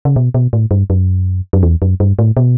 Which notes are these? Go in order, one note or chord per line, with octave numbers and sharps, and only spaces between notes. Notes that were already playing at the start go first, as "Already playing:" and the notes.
C#3
B2
B2
A2
G2
F#2
F#2
E2
F#2
G2
A2
B2